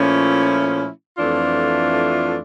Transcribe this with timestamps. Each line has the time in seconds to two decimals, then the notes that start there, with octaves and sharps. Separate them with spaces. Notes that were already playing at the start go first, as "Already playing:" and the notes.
Already playing: A#2 F3 A3 C#4 E4
1.18 F2 E3 A3 D4 F4